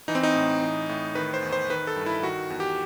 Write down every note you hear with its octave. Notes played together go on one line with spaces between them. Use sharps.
E3 D#4
C4
D#4
A2
E3
A2
D#3 B4
C5
E2
C5
D#3 B4
A4
G2
E4
D#3 F#4
E2
G4